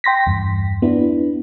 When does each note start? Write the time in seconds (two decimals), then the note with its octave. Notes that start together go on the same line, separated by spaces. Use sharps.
0.04 G5 C6 A#6 B6
0.27 E2 G2
0.82 B3 D4 E4